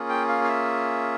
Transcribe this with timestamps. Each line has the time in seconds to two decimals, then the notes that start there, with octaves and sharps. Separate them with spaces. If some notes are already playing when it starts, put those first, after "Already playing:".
Already playing: A#3 C#4 F4 G#4
0.09 G5
0.29 F5
0.45 F5
0.49 E5